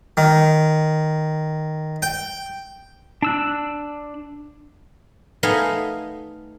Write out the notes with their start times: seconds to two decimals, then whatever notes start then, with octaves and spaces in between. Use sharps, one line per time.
0.17 D#3
2.02 G5
3.22 D4 E6 F#6
5.43 A3 B3 D#4 D#5 F5 G#5